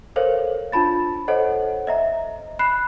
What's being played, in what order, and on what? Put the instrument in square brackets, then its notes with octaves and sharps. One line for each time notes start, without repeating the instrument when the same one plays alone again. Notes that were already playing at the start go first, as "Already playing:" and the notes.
[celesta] A4 A#4 C5 C#5 F5
D4 F4 A5 B5 A6
A4 C5 C#5 D#5 F#5
D#5 E5 A#5
B5 F#6 C7